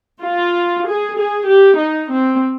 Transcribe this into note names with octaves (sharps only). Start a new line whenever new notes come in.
F4
G#4
G#4
G4
D#4
C4